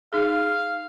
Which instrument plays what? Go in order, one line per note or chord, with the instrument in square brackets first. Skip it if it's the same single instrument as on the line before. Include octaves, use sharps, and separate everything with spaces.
[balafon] D#4 G#4 [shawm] F5